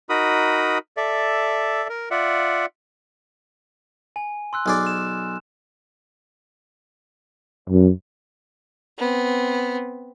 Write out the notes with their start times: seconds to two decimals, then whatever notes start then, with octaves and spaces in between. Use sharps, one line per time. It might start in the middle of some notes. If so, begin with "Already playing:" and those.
0.09 D#4 F#4 A#4 B5 D#6
0.97 A4 D5 E5
1.89 A#4
2.11 F4 D5 E5 F#5
4.16 G#5
4.53 C6 E6 F#6
4.66 B1 G#4 D5 F6
4.87 E7
7.70 F#2
8.99 B3 C4